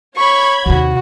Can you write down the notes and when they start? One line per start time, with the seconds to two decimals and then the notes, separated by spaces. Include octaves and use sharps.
0.17 C#5 B5 C#6 G#6
0.66 D#2 C3 F#4